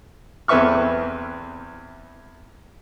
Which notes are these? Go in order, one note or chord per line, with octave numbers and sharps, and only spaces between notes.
E2 C4 B4 E5 C#6 F6